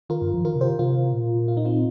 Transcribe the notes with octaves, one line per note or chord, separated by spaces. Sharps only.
D#3 F4 A#4
G2
F3
D#3 F4 A#4
C3
G4 C5
D#3
C3 F4 A#4
A#2
F4
D#4
C4 F4